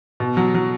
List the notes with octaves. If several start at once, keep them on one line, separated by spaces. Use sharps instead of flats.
B2
F#3
F#3